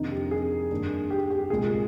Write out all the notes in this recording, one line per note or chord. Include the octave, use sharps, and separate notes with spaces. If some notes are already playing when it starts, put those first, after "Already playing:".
Already playing: F2 C3 D#3 A#3 D4 D#4
G4
G#4
G2 D#3 A#3 D4
G4
G4
C2 A#2 G#3 G#4